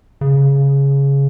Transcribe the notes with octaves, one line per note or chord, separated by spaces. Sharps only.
C#3